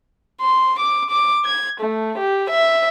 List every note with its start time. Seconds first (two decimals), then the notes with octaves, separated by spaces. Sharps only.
0.41 C6
0.79 D6
1.10 D6
1.45 G#6
1.80 A3
2.18 G4
2.50 E5